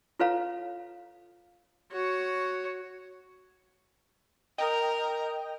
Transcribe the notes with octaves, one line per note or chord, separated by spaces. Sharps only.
F4 A4 B4 C#5 F5 A#5
F#4 C#5
A#4 D#5 G5 A#5